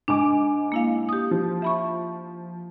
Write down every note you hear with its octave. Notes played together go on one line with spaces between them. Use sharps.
G#2 D4 G#5 D6
A#3 E4 F5
G4 D#6
F3
E5 B5 C#6